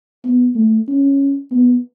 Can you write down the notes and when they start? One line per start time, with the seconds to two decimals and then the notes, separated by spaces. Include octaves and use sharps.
0.24 B3
0.55 A3
0.88 C#4
1.51 B3